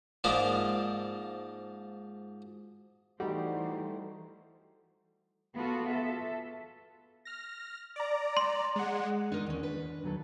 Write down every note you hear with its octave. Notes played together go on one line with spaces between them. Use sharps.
G#2 F3 A#3 D4
E3 G3 A3 D#4 F#4 G4 C5
B3 F4 F#4 A4
A4 E5
F6 A#6
D5 A#5
C6
G#3 F#5
D4 D#4 A#4 D#5
D#2 C#4
B4
D#2 F#3 A4